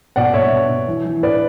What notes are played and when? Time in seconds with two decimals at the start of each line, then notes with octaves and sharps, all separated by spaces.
0.16 B2 D5 F#5
0.34 B2 C#5 E5
0.52 B2
0.69 B2
0.88 E3
1.05 E3
1.23 A2 B4 D5